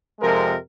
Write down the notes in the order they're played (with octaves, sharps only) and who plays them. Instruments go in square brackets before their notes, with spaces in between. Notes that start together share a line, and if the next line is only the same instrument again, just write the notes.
[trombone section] F2 C3 F3 G#3 A#4